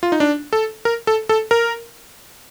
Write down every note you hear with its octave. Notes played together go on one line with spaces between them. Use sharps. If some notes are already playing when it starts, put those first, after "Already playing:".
F4
D#4
D4
A4
A#4
A4
A4
A#4